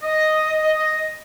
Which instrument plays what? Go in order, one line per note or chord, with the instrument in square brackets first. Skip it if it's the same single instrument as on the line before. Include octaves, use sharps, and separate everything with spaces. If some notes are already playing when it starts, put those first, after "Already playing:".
[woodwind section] D#5